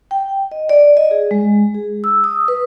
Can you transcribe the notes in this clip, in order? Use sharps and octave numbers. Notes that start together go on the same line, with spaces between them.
G5
D#5
D5
D#5
G#4
G#3
G#4
E6
D#6
B4